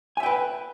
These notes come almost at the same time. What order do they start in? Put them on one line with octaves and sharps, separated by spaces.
G#5 E5 G5 B4